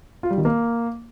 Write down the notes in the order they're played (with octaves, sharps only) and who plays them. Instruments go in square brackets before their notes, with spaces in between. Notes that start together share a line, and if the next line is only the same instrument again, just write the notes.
[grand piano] F4
G3
D#3
A#3